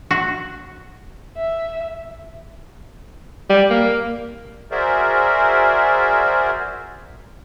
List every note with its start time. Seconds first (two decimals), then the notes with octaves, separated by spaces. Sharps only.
0.11 F#4
1.37 E5
3.49 G3
3.70 A#3
4.71 F#4 G#4 A#4 C5 D5 E5